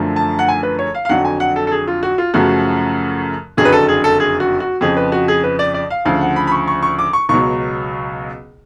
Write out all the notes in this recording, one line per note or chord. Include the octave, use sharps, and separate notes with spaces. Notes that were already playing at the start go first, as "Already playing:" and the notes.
Already playing: F#2 D3 F3 A3
A5
F#5
G#5
B4
C#5
F5
F5
F2 D3 F#3 F#5
G#5
F#5
A4
A4
G#4
F4
F#4
F4
F#2 C#3 F3 A3 F#4
F#1 F2 D3 F#3 G#4
B4
A4
G#4
A4
G#4
F#4
F#4
F2 C#3 F3 G#4
B4
F#4
G#4
B4
D5
D5
F5
D2 C#3 F3 F5
F#5
B5
B5
C#6
C#6
C#6
D6
C#6
C#2 B2 F#3 C#6